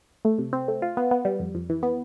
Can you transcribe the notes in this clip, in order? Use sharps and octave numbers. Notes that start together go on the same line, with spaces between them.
A3
C3
C4
A3
F4
B3
B3
G3
F2
F2
E3
B3